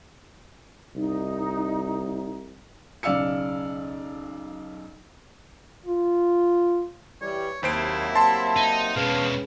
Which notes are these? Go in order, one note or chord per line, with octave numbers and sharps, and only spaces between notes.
C2 D#4
B1 C#3 D5 F5 E6 C#7
F4
E3 G3 C#5
D#2 C3 F#3 A#3 E4 C5 D7
A5 C6
D#4
B2 G#3 C#4 G#4 B4 F5